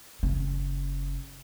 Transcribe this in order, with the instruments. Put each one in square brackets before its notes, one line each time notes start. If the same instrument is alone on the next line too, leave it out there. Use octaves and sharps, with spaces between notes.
[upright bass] F#1 C#3